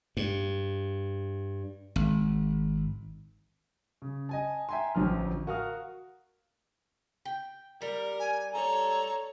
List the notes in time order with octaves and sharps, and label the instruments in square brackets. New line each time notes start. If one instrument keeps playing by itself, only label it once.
[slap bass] G2
G#1
[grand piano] C#3
D#5 G#5 A5
E5 G5 G#5 A#5 C6
A1 D2 F3 F6
F#4 A#4 F5 F#5 D#6 F6
[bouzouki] G5
[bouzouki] G3 [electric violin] A#4
[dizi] G#5
[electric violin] A4 C#5 [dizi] A#5